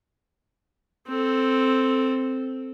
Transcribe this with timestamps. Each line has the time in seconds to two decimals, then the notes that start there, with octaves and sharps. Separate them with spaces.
1.08 C4 A4